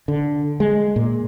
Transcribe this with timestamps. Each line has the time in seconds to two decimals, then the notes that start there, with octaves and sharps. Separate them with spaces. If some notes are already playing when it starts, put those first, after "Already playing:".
0.08 D3
0.60 G#3
0.96 A#2